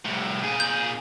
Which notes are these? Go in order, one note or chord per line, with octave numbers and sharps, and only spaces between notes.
C2 A2
A#2 G#4
G6